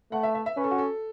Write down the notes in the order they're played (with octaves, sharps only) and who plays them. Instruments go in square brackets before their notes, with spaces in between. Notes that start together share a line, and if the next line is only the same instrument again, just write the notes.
[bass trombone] A3 [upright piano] F#5
[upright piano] E5
E5
E5
[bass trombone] C#4 [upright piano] B4
[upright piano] A4
F#4
A4